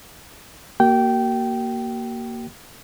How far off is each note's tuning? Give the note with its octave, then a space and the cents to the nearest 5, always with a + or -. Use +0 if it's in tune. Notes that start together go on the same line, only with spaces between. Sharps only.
A#3 +0 F#4 +45 G5 -15